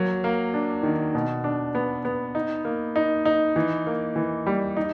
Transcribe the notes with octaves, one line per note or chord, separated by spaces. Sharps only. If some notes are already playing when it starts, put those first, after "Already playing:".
Already playing: F#3 A#3
A#3
D4
D#3
B2
D4
B3
B3
D#4
A#3
D#4
D#4
E3
A#3
E3
G3
D#4